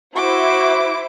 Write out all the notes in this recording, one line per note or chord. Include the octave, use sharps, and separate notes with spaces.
E4 F#4 C5 D6